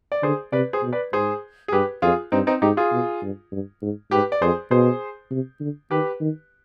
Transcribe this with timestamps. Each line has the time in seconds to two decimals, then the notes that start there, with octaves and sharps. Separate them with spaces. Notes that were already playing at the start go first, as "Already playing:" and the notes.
0.12 D5
0.23 D3 G#4 C5
0.52 C3 B4 D5
0.73 G#4 C5
0.83 B2
0.92 B4 D5
1.13 G#2 G#4 C5
1.68 G#4
1.73 G2 G4 B4
2.02 F2 F4 G#4
2.32 G2 C4 D#4
2.47 C4 D#4
2.62 G#2 D#4 G4
2.77 F4 G#4
2.92 B2
3.22 G2
3.52 G2
3.82 G#2
4.11 G#2 G4 B4
4.32 D5
4.42 F2 G#4 C5
4.71 B2 G#4 C5
5.31 C3
5.61 D3
5.91 D#3 G4 B4
6.21 D#3